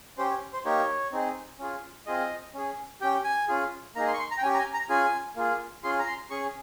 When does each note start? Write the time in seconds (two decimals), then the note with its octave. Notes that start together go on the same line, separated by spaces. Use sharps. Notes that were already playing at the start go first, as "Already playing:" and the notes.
0.18 C#4 G4 C5
0.30 C#5
0.53 C5
0.65 A#3 D#4 G4 C#5
1.12 C4 D#4 G#4
1.59 C#4 F4 G#4
2.06 C4 F4 G#4 D#5
2.54 C#4 G#4
3.01 C#4 G4 G5
3.24 G#5
3.48 C#4 F4 G#4
3.95 A#3 D#4 G#4 A#5
4.07 C6
4.13 C#6
4.19 C6
4.31 A#5
4.38 G5
4.42 C#4 G4 G#5
4.54 A#5
4.58 G#5
4.74 A#5
4.89 C#4 F4 G#4 G#5
5.36 A#3 F4 G#4
5.83 C#4 F4 G#4 C6
5.99 A#5
6.07 C6
6.30 C#4 G#4 C#6